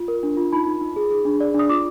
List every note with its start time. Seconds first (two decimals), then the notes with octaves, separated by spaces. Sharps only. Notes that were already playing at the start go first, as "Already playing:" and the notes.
Already playing: F4
0.08 A#4
0.23 D4
0.37 F4
0.53 D#4 B5
0.67 D#4
0.81 D#4
0.96 G#4
1.11 G#4
1.25 D4
1.40 D5
1.54 D4 D#6
1.69 F4 D6